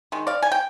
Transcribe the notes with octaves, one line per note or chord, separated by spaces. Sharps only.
D#3 G#3
D5 F5
G#5
G5